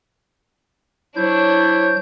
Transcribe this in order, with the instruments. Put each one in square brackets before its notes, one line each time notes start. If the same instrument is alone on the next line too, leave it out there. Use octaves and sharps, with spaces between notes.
[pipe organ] F#3 C5 G6 [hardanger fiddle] D4 C#5 [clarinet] E4